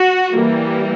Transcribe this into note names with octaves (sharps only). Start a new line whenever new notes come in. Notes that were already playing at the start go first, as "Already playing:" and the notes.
Already playing: F#4
E3 G3 A#3